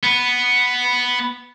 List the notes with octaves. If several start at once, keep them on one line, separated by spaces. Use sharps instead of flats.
B3